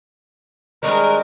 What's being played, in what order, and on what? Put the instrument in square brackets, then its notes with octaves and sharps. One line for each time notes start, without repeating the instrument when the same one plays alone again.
[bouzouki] D#3 G#3 B4 [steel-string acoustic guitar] G3 C4 D4 [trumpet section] A#4